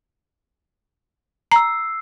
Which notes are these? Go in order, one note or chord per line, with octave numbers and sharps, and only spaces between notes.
A#5 E6 C7